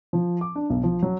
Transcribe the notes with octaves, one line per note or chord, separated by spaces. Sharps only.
F3
D6
D4
B1
F3
F#3